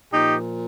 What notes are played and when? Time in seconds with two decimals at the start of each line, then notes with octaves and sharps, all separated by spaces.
0.11 A#2 F3 D#4 G4